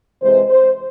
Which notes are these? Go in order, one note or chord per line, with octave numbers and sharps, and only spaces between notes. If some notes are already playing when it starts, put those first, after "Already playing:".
C3 E3 G#3 C5
C5